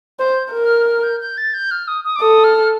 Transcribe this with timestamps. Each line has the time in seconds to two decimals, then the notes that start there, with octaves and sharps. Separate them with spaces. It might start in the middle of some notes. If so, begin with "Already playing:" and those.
0.19 C5 G6
0.52 A#4
0.64 F6
0.86 F6
1.03 G6
1.21 G6
1.38 A6
1.54 G6
1.71 F6
1.88 D#6
2.05 D#6
2.16 D6
2.21 A4 D#6
2.44 F6